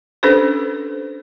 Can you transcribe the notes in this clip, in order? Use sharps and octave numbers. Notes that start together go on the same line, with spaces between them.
C#4 D4 G4 A4 B4 C5